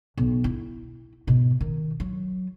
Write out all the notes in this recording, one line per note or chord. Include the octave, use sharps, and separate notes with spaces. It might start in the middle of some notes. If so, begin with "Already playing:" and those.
B1
E4
G#2 B2
D#3
F#3